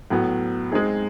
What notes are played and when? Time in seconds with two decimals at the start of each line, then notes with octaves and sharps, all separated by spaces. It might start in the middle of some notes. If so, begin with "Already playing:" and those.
0.10 A2 F#3 B3
0.71 G#3 C4 D#4 G#4